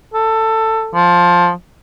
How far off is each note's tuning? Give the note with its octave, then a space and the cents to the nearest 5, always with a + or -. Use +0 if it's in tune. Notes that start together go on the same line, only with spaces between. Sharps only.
A4 +15
F3 +10